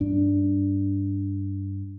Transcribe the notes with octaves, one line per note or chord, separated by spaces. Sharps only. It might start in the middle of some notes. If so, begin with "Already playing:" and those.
G2 D4